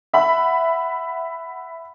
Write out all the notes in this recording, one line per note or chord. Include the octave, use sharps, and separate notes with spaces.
E5 F#5 B5